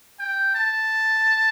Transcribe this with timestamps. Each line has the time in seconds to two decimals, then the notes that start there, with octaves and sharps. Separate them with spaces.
0.19 G5
0.55 A5